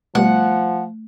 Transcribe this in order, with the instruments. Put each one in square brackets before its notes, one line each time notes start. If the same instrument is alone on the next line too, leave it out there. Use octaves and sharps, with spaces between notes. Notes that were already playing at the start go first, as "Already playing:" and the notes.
[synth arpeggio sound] B2 G3 [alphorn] F3 [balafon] A3 [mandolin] F#5